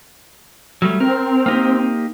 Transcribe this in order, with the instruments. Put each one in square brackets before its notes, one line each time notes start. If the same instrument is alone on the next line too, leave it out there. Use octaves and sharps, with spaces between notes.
[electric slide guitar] F#3 G3 A3
[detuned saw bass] C4 [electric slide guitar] A#4
[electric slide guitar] A#3 D#4 G4